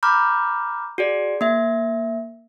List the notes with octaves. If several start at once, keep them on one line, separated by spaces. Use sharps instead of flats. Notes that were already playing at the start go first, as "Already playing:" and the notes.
A#5 B5 D6 F6 G6
F#4 G#4 D5
A#3 E5